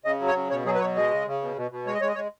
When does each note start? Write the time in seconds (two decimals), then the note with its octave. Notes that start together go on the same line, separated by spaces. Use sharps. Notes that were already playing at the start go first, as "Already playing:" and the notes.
0.05 C#3 D#5
0.20 F#3
0.27 C#5
0.35 C#3
0.50 B2 C#5
0.65 F#3 G#4
0.75 B4
0.80 B2 C#5
0.96 G#3 D#5
1.11 C#3
1.27 C#3
1.42 B2
1.56 B2
1.71 B2
1.86 G#3 C#5
1.94 D#5
2.01 G#3 C#5
2.08 D#5
2.15 G#3 C#5